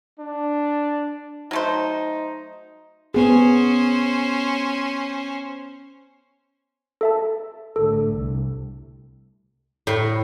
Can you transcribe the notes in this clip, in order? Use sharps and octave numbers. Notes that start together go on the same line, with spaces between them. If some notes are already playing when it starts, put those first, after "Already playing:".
D4
F#3 A3 D#4 C5
B3 C#4 G#4 C5
A4 E5 A5
A2 D3 A3 A4
C2
A2